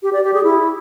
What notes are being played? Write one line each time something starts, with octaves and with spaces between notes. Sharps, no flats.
G4
D5
G4
G#4
E4